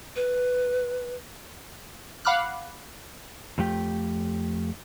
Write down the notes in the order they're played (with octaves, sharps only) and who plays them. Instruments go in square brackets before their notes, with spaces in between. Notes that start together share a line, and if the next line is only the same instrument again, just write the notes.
[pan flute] B4
[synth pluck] F5 F#5 B5 D6 F6 F#6
[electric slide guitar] F2 F3 A3 G4 G5